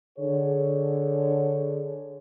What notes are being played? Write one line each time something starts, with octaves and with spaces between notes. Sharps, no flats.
D3 G#4 C#5